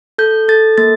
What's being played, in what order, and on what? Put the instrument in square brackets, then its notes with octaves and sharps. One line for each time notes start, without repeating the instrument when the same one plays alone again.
[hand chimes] A4 G6
A4 A6
A#3 A6